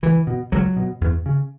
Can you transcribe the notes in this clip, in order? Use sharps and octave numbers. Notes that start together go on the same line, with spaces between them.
C#2 E3
B2
C#2 F#3
B2
E2
C#3